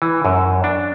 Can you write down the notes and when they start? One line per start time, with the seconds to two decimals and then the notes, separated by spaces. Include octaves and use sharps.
0.02 E3
0.25 F#2
0.64 D4